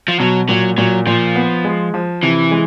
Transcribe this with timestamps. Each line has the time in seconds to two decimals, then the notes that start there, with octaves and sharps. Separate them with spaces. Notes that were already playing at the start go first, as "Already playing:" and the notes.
0.08 F3
0.20 B2 F#3
0.49 A#2 F#3
0.78 A#2 F#3
1.07 A#2 F3
1.35 B3
1.65 G#3
1.94 F3
2.23 C3 E3
2.51 G#3